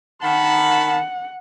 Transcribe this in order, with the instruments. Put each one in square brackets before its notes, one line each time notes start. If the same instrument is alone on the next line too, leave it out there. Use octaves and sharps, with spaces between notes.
[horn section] D#3 A5 B5 [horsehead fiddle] F#5